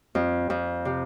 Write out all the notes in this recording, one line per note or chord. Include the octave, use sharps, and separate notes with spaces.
F2
F2
C3